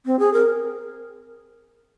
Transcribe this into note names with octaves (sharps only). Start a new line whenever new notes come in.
C4
G#4
A#4